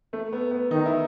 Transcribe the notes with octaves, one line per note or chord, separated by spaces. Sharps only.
A3
B3
B3
D#3 D#4
E4